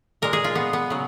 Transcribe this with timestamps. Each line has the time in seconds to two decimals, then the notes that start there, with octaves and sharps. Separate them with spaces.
0.22 A#2 G#3 A#4
0.33 G#4
0.44 F4
0.55 B3
0.73 B3
0.90 C#3 F#3